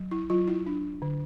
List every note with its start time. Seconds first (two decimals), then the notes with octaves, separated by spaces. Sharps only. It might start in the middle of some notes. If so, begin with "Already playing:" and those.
Already playing: F#3
0.11 E4
0.30 F#3 F4
0.48 E4
0.66 D4
1.02 D3